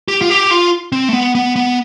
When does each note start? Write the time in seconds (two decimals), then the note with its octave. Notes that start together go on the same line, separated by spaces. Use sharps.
0.08 G4
0.21 F4
0.29 G4
0.51 F4
0.92 C4
1.09 A3
1.13 B3
1.35 B3
1.56 B3